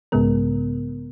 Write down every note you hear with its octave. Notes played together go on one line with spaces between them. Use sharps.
B1 G#2 C#3 G#3 B3 A#4